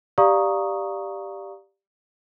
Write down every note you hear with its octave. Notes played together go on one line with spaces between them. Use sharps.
G4 D5 F5 A#5 C#6 D#6